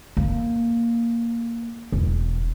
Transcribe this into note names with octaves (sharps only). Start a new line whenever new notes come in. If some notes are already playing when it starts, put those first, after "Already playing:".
A#3
E1